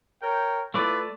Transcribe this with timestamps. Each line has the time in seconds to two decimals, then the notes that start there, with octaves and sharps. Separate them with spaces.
0.22 A#4 C#5 G5
0.74 A3 E4 F4 B4 D5